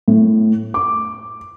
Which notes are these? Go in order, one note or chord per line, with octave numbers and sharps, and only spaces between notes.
A2
D6